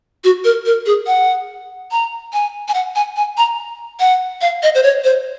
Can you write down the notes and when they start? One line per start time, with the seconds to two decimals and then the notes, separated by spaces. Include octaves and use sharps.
0.24 F#4
0.44 A#4
0.66 A#4
0.86 G#4
1.07 F#5
1.92 A#5
2.33 G#5
2.68 G#5
2.74 F#5
2.96 G#5
3.16 G#5
3.37 A#5
4.00 F#5
4.41 F5
4.63 D#5
4.75 C5
4.83 C#5
5.04 C5